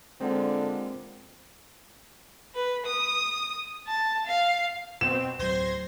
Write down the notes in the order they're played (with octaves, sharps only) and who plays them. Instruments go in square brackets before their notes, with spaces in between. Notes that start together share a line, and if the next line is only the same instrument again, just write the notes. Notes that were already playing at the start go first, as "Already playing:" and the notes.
[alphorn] D3 [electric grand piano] G#3 A#3 F4 [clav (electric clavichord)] C4
[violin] B4
D#6
A5
F5
[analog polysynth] B2 C4 [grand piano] E7
[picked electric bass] D1 F#3 [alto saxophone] C5 [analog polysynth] C6 G#6 A#6